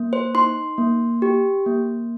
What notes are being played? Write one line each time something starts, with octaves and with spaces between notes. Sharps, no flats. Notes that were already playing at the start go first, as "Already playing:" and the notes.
Already playing: A#3
C5
D#4 C6
A#3
G4
A#3